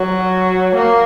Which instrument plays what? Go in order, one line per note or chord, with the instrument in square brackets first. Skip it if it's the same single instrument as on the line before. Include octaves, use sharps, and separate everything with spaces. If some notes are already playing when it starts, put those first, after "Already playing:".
Already playing: [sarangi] F#3
A#3